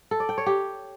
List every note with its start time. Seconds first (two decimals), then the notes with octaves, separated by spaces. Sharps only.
0.11 A4
0.20 D5
0.29 G5
0.38 C#5
0.46 G4